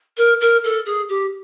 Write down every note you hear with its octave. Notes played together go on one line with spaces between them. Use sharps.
A#4
A#4
A4
G#4
G4